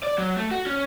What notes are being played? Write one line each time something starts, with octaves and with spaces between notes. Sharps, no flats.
D5
F#3
A3
F#4
C#4